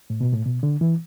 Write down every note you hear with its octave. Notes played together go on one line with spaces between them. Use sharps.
A2
B2
A2
B2
D3
E3